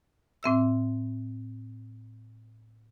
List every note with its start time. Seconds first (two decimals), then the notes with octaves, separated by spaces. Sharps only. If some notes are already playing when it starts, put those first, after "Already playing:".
0.43 A2 C4 E5 E6